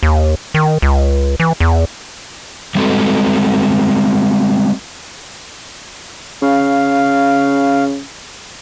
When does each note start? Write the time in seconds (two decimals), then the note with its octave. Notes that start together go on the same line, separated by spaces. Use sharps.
0.03 D#2
0.54 D#3
0.82 C#2
1.40 E3
1.60 E2
2.75 G3 G#3 C4 F#4 A4
6.42 C#3 F5